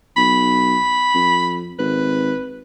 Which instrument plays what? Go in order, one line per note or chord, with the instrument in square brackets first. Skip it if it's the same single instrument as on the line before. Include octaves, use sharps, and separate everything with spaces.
[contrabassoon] B1 [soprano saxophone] B5
[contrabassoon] F2
[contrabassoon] G#1 [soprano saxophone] B4